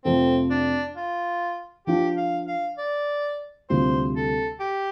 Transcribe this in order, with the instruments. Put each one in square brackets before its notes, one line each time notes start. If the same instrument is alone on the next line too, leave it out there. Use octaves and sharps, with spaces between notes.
[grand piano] F2 C3 F3 A3 [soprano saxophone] C4
[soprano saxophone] D4
F4
[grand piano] F3 D4 F4 [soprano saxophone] G4
[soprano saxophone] F5
F5
D5
[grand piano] D2 C3 G3 F4 [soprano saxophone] C5
[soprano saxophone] A4
G4